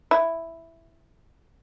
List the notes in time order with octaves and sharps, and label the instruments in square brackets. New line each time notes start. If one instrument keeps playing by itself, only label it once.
[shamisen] E4